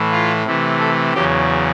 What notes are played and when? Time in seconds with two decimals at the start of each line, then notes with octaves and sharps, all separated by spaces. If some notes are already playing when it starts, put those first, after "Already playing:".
Already playing: A2 E3 A3
0.11 F4
0.46 C3 E3 A3
0.80 A4
1.13 E2 C#3 F#3 G4